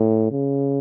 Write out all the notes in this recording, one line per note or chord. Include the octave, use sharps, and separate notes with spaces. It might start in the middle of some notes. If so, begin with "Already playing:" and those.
Already playing: A2
C#3